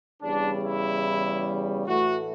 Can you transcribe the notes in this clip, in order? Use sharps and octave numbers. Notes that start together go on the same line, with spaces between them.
E2 C#3 G3 D4
E4
A2 E3 A3 F#4